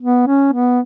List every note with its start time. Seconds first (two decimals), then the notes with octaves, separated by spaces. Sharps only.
0.02 B3
0.27 C#4
0.53 B3